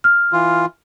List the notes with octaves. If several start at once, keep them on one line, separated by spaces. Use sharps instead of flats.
F6
E3 F4